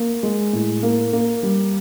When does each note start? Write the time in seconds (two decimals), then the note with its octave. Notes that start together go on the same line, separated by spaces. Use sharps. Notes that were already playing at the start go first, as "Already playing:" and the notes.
Already playing: A#3
0.23 G#3
0.53 A2
0.83 A#3
1.13 A#3
1.43 G3